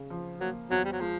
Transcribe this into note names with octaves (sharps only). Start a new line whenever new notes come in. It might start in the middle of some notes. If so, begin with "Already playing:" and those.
Already playing: C#3
F3
F#3 A#3
E2 F#3
G3
F#3
F3 G#3